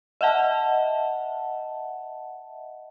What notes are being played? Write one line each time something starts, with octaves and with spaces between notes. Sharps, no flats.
D#5 E5 F#5 A5